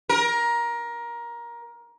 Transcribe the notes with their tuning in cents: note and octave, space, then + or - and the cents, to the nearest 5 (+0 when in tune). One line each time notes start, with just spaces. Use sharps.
A#4 +20